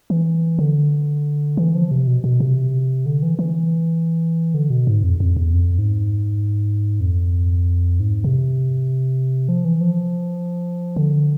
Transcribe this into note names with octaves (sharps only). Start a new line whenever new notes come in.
E3
D3
E3
F3
C3
B2
B2
C3
D3
E3
E3
D3
B2
G#2
F2
F2
E2
F2
G#2
F2
G#2
C3
F3
E3
F3
D3